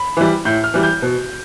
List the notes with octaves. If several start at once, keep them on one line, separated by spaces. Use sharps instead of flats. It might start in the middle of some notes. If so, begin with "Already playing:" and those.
Already playing: B5
E3 G3
A2 G6
F6
E3 G3
G6
B2